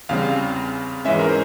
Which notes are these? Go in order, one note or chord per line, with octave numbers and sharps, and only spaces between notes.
E2 C#3 G3 C4 F5
G#2 E3 G#3 C#4 E5
A#4
C5